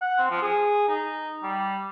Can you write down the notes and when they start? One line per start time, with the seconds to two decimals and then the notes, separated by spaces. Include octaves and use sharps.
0.01 F#5
0.18 C4
0.31 F3
0.42 G#4
0.89 D#4
1.43 G3